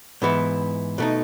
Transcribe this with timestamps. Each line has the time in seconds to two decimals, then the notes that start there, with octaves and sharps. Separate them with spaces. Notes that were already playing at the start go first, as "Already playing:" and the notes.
0.22 G#2 E3 B3 E4
0.98 B2 A3 D#4